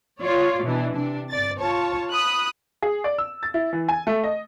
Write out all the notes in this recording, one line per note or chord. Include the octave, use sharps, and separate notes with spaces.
F4 C#5 D5
B2 E3 D4
C3 D4
G1 D5 A6
F4 C#5 A5
B5 D#6 F#6
G#4
D5
E6
A6
E4
E3
G#5
A3
D#5